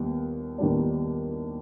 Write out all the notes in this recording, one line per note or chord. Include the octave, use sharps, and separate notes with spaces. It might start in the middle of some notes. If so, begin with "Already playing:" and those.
Already playing: D#2 D#3 G3 B3 D4
D#2 D#3 G3 B3 D4